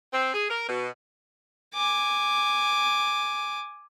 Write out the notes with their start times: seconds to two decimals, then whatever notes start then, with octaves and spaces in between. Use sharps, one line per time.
0.13 C4
0.32 G#4
0.49 A#4
0.67 B2
1.74 G#5 D6